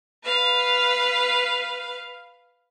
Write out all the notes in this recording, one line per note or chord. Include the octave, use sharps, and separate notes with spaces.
B4 F5